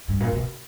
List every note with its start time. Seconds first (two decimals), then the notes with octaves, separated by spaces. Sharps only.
0.08 G2
0.20 A#2
0.33 B2